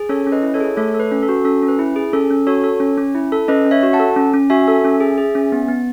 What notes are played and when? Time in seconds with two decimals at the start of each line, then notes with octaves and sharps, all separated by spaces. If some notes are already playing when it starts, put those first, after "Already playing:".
Already playing: G#4
0.09 C#4 A4 C#5
0.27 C#4
0.32 B4 D#5
0.43 E4
0.54 A4 C#5
0.60 G#4
0.77 A3 A4 C#5
0.94 A4
1.00 B4
1.12 C#4
1.23 A4
1.29 F#4
1.45 C#4 A4
1.63 C#4
1.68 B4
1.79 E4
1.96 G#4
2.13 C#4 A4
2.30 C#4
2.47 F#4 A4 C#5
2.64 A4
2.80 C#4
2.98 C#4
3.15 E4
3.32 A4
3.48 C#4 B4 D#5
3.65 C#4
3.71 C#5 E5
3.83 F#4
3.93 F#5 A5
4.00 A4
4.16 C#4
4.33 C#4
4.50 F#4 E5 G#5
4.68 A4
4.84 C#4
5.00 G#4
5.18 G#4
5.35 C#4
5.52 B3
5.68 B3